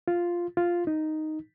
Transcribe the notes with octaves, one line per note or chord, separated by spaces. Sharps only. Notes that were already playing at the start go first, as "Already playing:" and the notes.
F4
F4
D#4